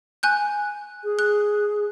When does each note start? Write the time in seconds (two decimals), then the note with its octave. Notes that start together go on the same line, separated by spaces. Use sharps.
0.23 G#5 F#6 G6
1.04 G#4
1.19 F#6